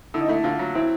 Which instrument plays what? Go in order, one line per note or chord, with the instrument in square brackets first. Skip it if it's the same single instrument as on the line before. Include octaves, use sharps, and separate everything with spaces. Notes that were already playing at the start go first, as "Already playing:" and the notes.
[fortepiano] D3 [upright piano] E4
[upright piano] D#4
[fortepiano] A3 [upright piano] E4
[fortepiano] D3 [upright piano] F4
[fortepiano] F#3
[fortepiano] C4 [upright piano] E4